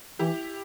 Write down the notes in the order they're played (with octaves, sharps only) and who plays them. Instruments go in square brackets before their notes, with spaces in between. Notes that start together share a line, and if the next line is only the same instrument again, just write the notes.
[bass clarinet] E3 [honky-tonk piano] E4 G4